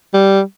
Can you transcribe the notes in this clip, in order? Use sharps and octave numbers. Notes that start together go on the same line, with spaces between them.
G3